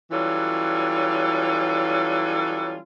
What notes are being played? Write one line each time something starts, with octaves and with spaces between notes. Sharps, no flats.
E3 F#3 G3 C#4 F4 A4